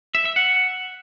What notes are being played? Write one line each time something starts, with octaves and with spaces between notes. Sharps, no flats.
E5
E5
F#5